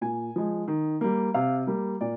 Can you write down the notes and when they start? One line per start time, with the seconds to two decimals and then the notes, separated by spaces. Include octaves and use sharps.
0.01 A#2 G#5
0.36 F3 G#3
0.68 D#3
1.01 G3 A#3
1.34 C3 F5
1.67 G3 A#3
2.01 A#2 D5